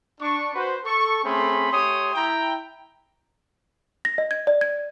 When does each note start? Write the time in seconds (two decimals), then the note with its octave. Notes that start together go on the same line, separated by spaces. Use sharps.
0.21 D4 C#6
0.55 F#4 B4 C5
0.85 A4 C#6
1.24 A3 C4 C#4 G#4 B5 C6
1.71 A3 G4 C#5 C6 D#6
2.14 E4 G5 A#5
4.05 A#6
4.18 D#5
4.31 G#6
4.47 D5
4.61 G#6